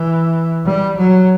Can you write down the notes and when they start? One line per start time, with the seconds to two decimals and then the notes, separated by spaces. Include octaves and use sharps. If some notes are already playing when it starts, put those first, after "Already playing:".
Already playing: E3
0.65 G3
0.98 F#3